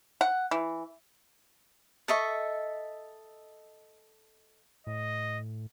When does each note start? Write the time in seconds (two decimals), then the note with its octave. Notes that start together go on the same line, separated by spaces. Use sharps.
0.21 F#5
0.51 E3
2.08 A4 D#5 E5 C#6
4.87 A2 D#5